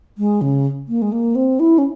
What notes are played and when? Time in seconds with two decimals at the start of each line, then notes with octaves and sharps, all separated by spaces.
0.18 G#3
0.41 C#3
0.88 A#3
1.02 G#3
1.12 A#3
1.35 C4
1.60 E4
1.78 C#4